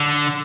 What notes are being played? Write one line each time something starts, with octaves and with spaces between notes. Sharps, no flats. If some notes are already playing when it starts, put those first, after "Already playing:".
Already playing: D3